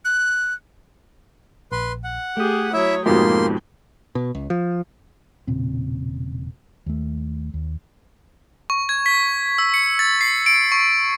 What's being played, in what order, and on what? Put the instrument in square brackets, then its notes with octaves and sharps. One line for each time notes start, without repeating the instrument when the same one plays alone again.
[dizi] F#6
[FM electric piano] A#1 [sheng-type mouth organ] B4 C6
[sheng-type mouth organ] F#5
[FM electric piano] A3 D#6 [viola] G4 G#4
[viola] F#3 C#5 [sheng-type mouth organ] E4 E5
[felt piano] F2 G#2 B2 [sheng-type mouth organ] A#3 C6 [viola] G4
[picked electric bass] B2
C#2
F3
[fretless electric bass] E1 A#2 C#3 C4
D#2 A3
D#2
[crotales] C#6
G#6
B6
E6
C#7
A6
C7
D7
C#6